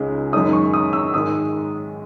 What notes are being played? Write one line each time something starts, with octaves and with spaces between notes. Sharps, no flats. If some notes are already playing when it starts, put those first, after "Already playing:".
Already playing: C#2 C#3 G#3 D#4
F#2 D#3 G#3 D#4 D#6
C#6
D#6
E6
G#2 D#3 G#3 D#6